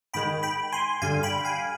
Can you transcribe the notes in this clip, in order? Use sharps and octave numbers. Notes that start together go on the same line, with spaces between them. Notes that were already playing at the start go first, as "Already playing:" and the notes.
G#2 D#3 G#3 G5 B5
G5 B5
G#5 C6
G2 D3 G3 F5 G#5
G5 B5
F5 G#5